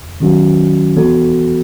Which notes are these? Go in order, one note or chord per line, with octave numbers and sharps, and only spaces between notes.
D#3 F#3 C#4 F#4
E3 B3 F#4 A4